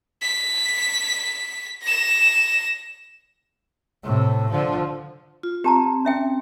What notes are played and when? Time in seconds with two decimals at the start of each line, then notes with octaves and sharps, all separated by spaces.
0.22 B6
1.83 A#6 E7
4.03 A2 C3
4.50 D3 F3
5.43 F4
5.64 C4 G4 A5 A#5
6.05 C#4 E5 G5